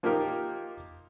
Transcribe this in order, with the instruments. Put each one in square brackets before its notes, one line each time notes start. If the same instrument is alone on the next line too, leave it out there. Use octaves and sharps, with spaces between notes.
[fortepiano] F3 A#3 D#4 F4 G4 A#4